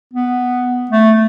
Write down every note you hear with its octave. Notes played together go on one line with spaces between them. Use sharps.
B3
A3